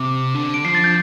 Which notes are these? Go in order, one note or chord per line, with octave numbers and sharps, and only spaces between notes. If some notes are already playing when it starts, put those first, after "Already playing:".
Already playing: C3 D6
D3
D7
F3 C7
A6
G6